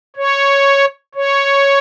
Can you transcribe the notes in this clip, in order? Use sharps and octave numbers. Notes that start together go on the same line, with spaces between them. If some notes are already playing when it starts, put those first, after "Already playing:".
C#5
C#5